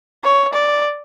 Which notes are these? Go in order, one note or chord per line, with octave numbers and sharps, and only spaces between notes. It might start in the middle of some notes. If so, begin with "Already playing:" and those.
C#5
D5